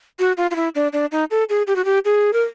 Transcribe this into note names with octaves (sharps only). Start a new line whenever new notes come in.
F#4
F4
F4
E4
D4
D4
D#4
A4
G#4
G4
F#4
G4
G#4
A#4